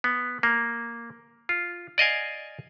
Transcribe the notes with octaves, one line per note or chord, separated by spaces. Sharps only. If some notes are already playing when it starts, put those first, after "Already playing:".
B3
A#3
F4
D5 D#5 F5 G#5